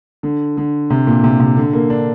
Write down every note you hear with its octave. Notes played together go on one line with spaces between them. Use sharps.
D3
D3
C3
A#2
C3
C3
D3
A#3
D4